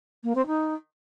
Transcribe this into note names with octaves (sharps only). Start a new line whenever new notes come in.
A#3
C4
D#4